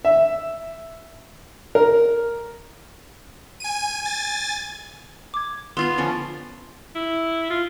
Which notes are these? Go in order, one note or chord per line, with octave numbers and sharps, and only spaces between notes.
E5
A#4
G#5 D#7
G#5 A6
D6 G#6
B3 F4 F5 C6
D3 F3 C#4 A6
E4
F4